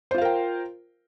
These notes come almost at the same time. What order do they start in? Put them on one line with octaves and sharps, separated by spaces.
C5 F4 F5 A#4 G5